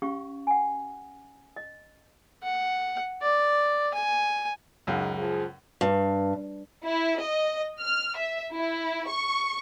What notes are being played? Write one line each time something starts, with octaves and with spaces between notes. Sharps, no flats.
C#4 G4 F5 C#6
F#5 G#5
D#5
F#5
D5
G#5
C#2 F#2 D#4 G#4 F5
F3 G#4
G2
E4
D#5
F6
E5
E4
C#6